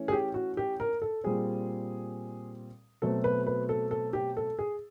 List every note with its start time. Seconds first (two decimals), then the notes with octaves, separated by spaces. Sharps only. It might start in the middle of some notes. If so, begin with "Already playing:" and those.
Already playing: E3 A3 C#4
0.08 G#4
0.12 G4
0.34 F#4
0.57 G4
0.80 A#4
1.02 A4
1.24 A#2 G3 C4 G#4
3.02 B2 F#3 A3 C4 A4
3.24 B4
3.47 B4
3.69 A4
3.91 A4
4.13 G4
4.37 A4
4.59 G#4